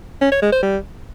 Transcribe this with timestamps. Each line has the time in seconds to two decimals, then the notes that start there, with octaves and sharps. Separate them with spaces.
0.21 C#4
0.32 C#5
0.42 G#3
0.52 C5
0.63 G3